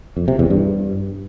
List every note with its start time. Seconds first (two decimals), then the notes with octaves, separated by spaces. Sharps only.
0.17 F2
0.28 C3
0.39 E2
0.50 G2